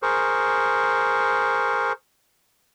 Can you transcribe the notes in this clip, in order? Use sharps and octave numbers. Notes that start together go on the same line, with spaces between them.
G#4 A#4 C5 C#6